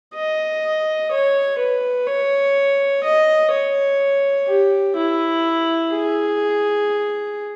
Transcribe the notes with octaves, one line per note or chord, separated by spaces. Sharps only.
D#5
C#5
B4
C#5
D#5
C#5
G4
E4
G#4